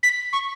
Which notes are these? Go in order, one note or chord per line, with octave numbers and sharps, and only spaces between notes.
B6
C#6